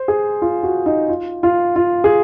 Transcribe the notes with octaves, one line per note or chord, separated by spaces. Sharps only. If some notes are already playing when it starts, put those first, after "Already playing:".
Already playing: C5
G#4
F4
F#4
D#4
F4
F4
F4
G#4